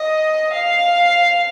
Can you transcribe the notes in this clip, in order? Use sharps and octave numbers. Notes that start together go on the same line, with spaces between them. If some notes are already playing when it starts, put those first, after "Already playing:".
Already playing: D#5
F5